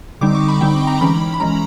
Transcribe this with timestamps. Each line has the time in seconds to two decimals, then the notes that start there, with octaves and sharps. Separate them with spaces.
0.21 D3 G3 C4 D#4 D6
0.35 C#6
0.48 B5
0.61 D3 G3 C4 D#4 G5
0.87 A#5
1.01 E3 G#3 C#4 B5
1.34 B5
1.40 E3 G#3 C#4 A#5